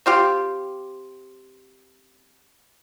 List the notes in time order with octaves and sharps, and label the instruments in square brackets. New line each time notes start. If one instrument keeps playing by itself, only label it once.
[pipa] C4 F4 G4